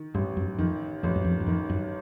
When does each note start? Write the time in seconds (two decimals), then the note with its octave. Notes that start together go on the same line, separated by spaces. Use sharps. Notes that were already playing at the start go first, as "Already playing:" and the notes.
Already playing: D#3
0.14 A1 G2
0.37 F#2
0.58 F2 D#3
1.03 A1 F2
1.16 F#2
1.25 F2
1.40 F#2
1.47 F2 D#3
1.70 F#2